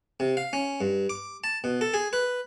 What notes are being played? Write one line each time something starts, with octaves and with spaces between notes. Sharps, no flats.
C3
F5
C#4
G2
D6
A5
B2
A4
G#4
B4